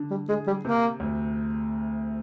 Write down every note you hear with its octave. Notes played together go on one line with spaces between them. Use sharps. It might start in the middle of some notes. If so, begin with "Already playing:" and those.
Already playing: D3
G3
G#3 G#4
G3
C3 A#3
D2